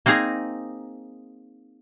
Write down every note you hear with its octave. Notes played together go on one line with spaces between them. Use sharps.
A#3 C4 D#4 G#4 A#5